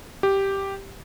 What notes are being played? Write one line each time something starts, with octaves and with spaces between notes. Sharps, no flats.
G4